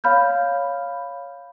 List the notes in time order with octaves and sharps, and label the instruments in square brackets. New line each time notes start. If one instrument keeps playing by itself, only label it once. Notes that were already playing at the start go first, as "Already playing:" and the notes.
[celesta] C#5 F5 B5 F6 G6